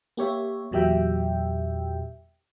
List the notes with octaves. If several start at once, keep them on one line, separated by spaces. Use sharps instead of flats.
A#3 G4 C#5 E5
E2 A#2 F#3 G4 E5 G5